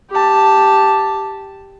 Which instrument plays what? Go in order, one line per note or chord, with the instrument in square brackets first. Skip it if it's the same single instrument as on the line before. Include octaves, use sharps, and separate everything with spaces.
[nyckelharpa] G4 A5